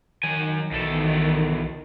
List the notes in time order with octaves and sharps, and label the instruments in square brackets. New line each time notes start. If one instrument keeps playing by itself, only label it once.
[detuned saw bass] D#3 [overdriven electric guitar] F#3 G#5
[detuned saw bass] B1 [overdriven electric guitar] E2 A4 [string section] D#3